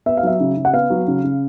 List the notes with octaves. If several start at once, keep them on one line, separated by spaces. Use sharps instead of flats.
B3 E5
F5
F#3 E5
C#3
C#3
F#5
B3 F5
F#3
C#3
C#3